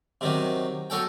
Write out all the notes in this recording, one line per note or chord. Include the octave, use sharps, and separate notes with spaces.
C3 D#3 F#3
F#3 C#4 A4 G5